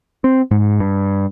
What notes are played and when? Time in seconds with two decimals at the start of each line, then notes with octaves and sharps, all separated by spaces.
0.24 C4
0.51 G#2
0.80 G2